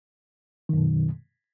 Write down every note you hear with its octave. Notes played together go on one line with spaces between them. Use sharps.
F#2 B2 D#3